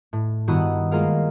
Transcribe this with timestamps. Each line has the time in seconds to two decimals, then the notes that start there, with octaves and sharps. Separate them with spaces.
0.13 A2
0.48 G2 D#3 B3 E4 F#4 D#6
0.91 G#3 A#3 F4 G#4 A#4 F5